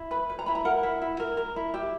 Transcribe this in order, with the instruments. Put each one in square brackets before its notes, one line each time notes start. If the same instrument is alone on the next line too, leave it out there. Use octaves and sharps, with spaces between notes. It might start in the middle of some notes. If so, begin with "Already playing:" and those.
Already playing: [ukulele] E4
B4 B5
B4
A#5
E4 B5
A#5
A#4 F#5
E4
E4
A#4
A#4
E4
G4 E5